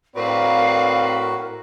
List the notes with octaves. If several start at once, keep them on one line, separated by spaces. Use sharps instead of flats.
A2 C4 F#4 A#4 B4 D5 F5